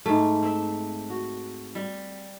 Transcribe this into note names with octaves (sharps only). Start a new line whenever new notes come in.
G#2 A3
C4 E5
F#4
G3